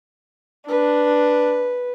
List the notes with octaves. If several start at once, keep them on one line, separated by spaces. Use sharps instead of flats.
D4 B4